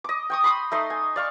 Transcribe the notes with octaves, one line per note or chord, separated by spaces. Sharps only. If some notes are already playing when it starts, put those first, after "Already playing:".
D#5 D6
G5 C#6 D#6
B5 C6 D#6
A3 D#4 C6
G#5
D5 F5 C#6